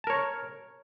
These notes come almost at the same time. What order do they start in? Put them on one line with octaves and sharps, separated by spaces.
A5 A#4 C#5